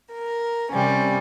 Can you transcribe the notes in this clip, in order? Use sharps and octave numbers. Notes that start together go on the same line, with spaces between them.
A#4
C3 G3 C#4